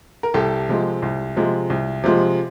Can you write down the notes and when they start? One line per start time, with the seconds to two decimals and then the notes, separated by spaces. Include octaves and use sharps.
0.23 A#4
0.34 C2 G4 A4
0.69 C3 F3 G#3
1.02 C2
1.37 C3 F3 G#3
1.70 C2
2.04 C3 F3 G#3